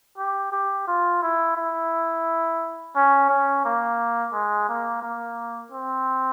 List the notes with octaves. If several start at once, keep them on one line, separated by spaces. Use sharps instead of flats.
G4
G4
F4
E4
E4
C#4
C#4
A#3
G#3
A#3
A#3
C4